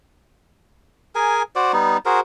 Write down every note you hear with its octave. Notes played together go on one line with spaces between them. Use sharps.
G#4 A#4 G#5
F#4 C5 D5
G3 B3 D#4
F#4 G#4 A#4 C5